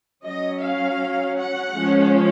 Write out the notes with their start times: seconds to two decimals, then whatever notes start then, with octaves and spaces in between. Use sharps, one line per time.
0.24 F#3 C#4 D#5
0.63 F5
1.37 F#5
1.75 F3 G#3 C#4